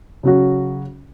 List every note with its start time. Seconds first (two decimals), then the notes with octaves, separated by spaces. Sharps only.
0.23 C#3 F#3 C#4 F#4